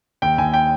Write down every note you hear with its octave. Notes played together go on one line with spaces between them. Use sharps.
D#2 G5
D#2 G#5
G5